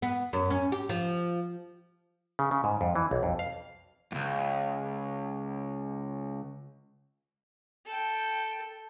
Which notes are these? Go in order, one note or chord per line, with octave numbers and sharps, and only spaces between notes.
B3
F#2
C#4
G4
F3
C#3
C#3
G#2
F2
E3
B1
F2
F5
C#2 F#2
A4 G5